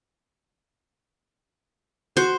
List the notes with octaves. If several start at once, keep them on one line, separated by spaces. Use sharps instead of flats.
F#4 C5